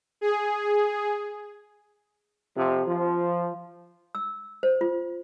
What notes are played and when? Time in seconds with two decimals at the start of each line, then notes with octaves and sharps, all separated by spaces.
0.21 G#4
2.56 F2 C3 F3
2.87 F3
4.15 E6
4.63 C5
4.81 F4